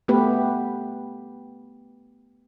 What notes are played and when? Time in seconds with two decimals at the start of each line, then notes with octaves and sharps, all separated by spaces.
0.08 A3 B3 G4 B4